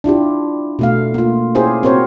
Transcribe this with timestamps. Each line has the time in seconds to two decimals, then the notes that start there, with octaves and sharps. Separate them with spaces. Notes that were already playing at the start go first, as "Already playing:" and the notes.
0.04 D4 E4 F4 G4
0.79 B2 A3 F5
1.14 A#3 F4
1.55 C#4 E4 G4 G#4 A#4 C5
1.83 C4 F#4 A#4 C5 C#5